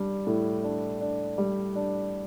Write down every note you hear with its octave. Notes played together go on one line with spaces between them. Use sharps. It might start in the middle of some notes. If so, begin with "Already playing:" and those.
Already playing: G3 D4
A2
D4
D4
G3
D4